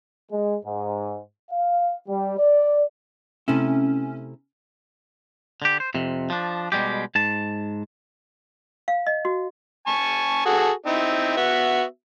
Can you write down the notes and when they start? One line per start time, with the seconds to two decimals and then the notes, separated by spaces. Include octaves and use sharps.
0.30 G#3
0.65 G#2
1.51 F5
2.08 G3
2.38 D5
3.48 C3 A3 C#4 E4
5.62 D3 G4
5.80 C5
5.94 F2 C3
6.30 F3 D4
6.72 B2 G3 G#3 G4
7.15 G#2 A5
8.88 F5
9.07 D#5
9.25 F#4
9.87 G#5 A5 C#6
10.46 F#4 G#4 A4
10.86 C4 D#4 E4
11.37 B3 F#4 E5